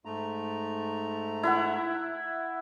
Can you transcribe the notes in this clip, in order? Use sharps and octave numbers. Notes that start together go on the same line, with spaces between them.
G#2 A3 A#5
E4 E5 F#5